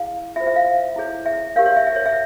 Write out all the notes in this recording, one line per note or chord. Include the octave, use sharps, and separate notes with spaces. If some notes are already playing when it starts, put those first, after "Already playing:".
Already playing: E4 G#4 F5
F4 C5 E5
E5
F5
E4 G#4 C#5
E5
G4 A#4 C#5 F5
C#5
E5
E5
C#5
E5